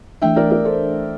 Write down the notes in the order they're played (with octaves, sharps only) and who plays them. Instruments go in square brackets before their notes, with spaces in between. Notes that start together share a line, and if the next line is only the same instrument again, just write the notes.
[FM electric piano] E3 A3 D4 [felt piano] E5 G5
[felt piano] A#4 D5
A#4 D5
A4 C5